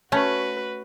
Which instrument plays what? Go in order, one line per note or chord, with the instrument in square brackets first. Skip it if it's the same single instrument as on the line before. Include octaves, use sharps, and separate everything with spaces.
[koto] A3 C#4 [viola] F#4 B4